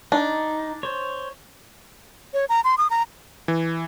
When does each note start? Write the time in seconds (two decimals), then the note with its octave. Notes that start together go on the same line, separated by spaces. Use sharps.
0.12 D4 D#4
0.83 C5 C#5
2.34 C#5
2.49 A#5
2.64 C6
2.78 D#6
2.90 A#5
3.48 E3